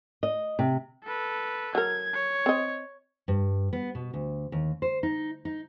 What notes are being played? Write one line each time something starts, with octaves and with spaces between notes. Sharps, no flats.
D#5
C3
A4 B4
F#3 A#4 G#6
C#5
C4 D#5
G2
B3
B2
D2
D#2
C5
D#4
D#4